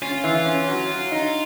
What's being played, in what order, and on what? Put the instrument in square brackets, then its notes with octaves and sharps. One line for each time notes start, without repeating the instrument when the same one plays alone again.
[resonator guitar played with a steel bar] C#4 [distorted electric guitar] F4
[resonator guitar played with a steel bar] E3
C#4
F#3
F#3
D#4